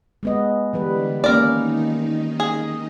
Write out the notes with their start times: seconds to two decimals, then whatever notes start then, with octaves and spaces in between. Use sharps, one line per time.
0.23 G#3 B3 D#5
0.73 D3 E3 G3 B4
1.24 D#3 A#3 C#4 D#4 A#4 D5
2.40 G#4